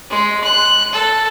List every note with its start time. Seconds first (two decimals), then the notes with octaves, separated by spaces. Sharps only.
0.10 G#3
0.44 F#6
0.93 A4